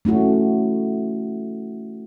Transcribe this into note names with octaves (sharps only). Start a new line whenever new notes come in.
A3 C#4 E4 F#4